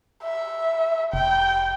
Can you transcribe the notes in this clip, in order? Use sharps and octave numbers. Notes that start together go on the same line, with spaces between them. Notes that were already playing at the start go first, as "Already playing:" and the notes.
E5
F1 G5